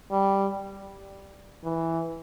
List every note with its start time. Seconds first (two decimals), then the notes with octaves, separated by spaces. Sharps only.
0.12 G3
1.64 E3